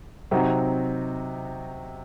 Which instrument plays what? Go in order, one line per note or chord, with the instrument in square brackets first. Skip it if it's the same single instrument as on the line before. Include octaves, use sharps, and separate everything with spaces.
[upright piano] C3 F#3 C4 D#4 F#4